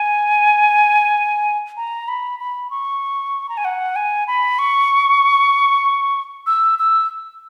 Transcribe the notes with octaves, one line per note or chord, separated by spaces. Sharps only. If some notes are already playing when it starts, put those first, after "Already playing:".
Already playing: G#5
A#5
B5
B5
C#6
A#5
G#5
F#5
G#5
B5
C#6
E6
E6